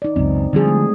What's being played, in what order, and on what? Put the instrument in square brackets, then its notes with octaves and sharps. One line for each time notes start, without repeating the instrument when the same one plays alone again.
[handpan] D#4 D5
[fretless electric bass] C#2 F#2 [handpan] C4
[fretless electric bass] D3 F3 [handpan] G3 C4 G#4
[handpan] G#3 A3